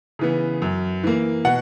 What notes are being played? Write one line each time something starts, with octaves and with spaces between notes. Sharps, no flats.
C#3 E3 B3
F#2
E3 A#3
B2 F#5